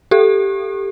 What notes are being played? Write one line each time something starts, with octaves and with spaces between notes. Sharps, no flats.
G4 A4